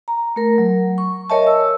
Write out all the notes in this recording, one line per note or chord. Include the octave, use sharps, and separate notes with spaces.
A#5
A3 A#4
F#3
C#6
A#4 C#5 D#5 E5 G#5 A5
E6